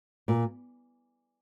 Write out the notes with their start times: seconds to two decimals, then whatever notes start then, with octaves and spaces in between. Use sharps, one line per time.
0.28 A#2